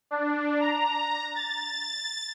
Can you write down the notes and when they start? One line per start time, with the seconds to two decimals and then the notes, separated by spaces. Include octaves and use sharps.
0.11 D4
0.61 A#5
1.35 A6